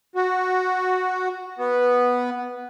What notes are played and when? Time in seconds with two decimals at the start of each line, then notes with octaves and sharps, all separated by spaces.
0.15 F#4
1.59 B3